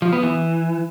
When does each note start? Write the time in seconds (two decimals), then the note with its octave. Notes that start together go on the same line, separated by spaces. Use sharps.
0.02 F3
0.13 B3
0.23 E3